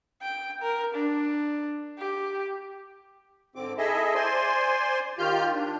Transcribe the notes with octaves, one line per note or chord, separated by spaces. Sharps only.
G5
A#4
D4
G4
G#2 D3 C4 D6
E4 G#4 A4 D#5 E5
C5 D5 G#5 C6
D#3 F4 G4 F6 G6
D4